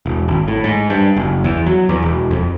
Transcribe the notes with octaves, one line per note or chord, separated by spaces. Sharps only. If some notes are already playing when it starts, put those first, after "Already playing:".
E1
G#1
A2
G#2
G2
F#1
E2
F#3
E2
E1
F2